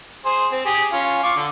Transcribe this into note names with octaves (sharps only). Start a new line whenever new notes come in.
G#4 C5
C4
G4 G#4
C#4 F4
F4 C#6 D6
D3